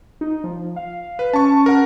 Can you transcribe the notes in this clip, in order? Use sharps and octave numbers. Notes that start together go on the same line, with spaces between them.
D#4
F3
F5
B4
C#4 A5 C#6
A#4 F#5